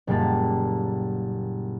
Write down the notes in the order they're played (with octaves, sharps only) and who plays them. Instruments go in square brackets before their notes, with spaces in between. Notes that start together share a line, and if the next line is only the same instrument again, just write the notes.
[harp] F#1 A#2 G3 A#3 A5